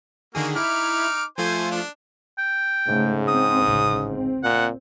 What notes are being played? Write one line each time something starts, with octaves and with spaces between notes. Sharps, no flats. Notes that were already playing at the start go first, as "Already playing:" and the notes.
D3 D#3 A#3 F#4 G#4
D#4 E4 D6 F6
F3 A3 F4 C5 G#5
D4
G5
G#2 C#3 A3
C4 D#6
A1 D2 C#3
C4
A#2 F#5